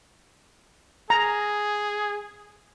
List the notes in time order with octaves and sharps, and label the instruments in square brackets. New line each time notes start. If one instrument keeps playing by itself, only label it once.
[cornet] G#4 [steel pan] A#5